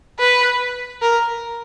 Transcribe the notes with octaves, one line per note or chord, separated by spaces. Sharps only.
B4
A#4